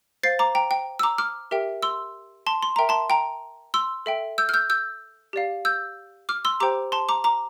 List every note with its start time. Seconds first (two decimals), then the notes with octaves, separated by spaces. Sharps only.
0.23 C5 F5 A6 C7
0.39 A#5 D6
0.55 G5 A#5
0.71 G5
0.99 E6
1.03 A#5 D6
1.18 D6 F6
1.51 G4 A#4 E5 G5
1.82 C6 E6
2.47 A5 C6
2.63 C6
2.76 A#4 E5 G5 A#5
2.89 A5 C6
3.10 G5 A#5
3.74 C6 E6
4.06 A4 E5 G5
4.38 E6 G6
4.49 F6
4.54 E6 G6
4.70 E6 G6
5.33 G4 D5 F5
5.65 E6 G6
6.29 D6 F6
6.45 C6 E6
6.60 G4 C5 G5 A#5 D6
6.92 A5 C6
7.09 A#5 D6
7.24 A#5 D6